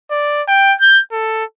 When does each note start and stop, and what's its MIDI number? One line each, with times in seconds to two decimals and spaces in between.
0.11 0.42 74
0.48 0.74 79
0.81 1.01 91
1.12 1.44 69